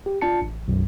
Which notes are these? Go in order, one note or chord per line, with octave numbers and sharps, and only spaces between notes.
G4
D4 F4 A5 C#7
A1
B1 F#2